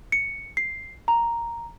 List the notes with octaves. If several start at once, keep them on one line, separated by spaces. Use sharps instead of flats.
C#7
C7
A#5